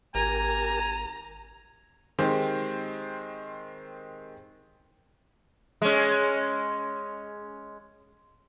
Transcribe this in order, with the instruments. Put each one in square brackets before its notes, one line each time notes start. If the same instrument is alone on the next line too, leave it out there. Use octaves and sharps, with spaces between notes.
[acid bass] G#1 [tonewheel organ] G4 A#4 [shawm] G#5 [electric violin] A#5
[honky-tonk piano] D#3 G#3 C4 G4 C5
[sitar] G#3 C#4